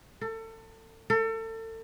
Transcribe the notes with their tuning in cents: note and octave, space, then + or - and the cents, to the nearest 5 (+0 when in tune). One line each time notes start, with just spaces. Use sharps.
A4 +30
A4 +35